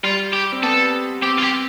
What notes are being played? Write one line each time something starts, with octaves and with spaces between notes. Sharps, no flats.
G3 F4
G4
C4
B3 A4
C4 G4
F4
G4